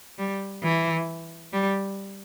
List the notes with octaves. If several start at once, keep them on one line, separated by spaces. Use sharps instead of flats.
G3
E3
G3